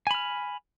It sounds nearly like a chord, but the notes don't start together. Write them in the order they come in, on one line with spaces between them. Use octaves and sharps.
G#5 B5 F6